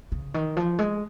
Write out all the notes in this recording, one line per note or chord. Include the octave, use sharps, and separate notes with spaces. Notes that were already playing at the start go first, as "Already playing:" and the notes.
C#3
D#3
F3
G#3